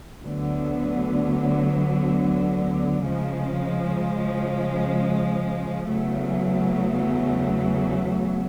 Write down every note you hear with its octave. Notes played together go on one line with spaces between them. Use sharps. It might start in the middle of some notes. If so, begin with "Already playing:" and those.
D2 D3 F#3 B3
C#3 F3 G#3
E2 C#3 F#3 A3